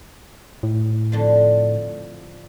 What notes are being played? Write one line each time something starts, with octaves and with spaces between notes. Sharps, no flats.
A2
F2 D3 F3